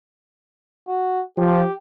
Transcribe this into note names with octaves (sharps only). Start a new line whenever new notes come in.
F#4
F3 G4